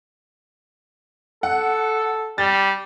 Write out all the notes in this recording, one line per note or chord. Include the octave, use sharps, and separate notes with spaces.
A4 F#5
G3 A6